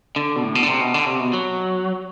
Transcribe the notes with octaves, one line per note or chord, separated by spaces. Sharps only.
D3
B2
A2
B2
D3
C3
B2
D3
C3
B2
F#3